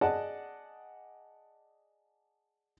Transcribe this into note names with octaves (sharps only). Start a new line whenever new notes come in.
G#4 D5 D#5 F#5 A5